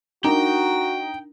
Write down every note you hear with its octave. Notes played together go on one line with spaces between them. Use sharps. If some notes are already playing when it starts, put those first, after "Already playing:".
D4 D#4 F#4 A#4 G5